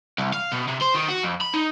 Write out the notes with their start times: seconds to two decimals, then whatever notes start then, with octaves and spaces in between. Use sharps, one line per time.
0.18 C2
0.33 F5
0.52 B2
0.68 C3
0.82 C5
0.96 D#3
1.10 F#4
1.24 F2
1.42 B5
1.54 D#4